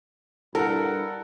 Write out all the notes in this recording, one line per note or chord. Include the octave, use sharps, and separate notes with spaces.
G2 E4 A4 A#4 F#5